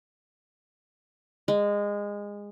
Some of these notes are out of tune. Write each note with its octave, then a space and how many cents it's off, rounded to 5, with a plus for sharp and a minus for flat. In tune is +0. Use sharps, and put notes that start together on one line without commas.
G#3 -20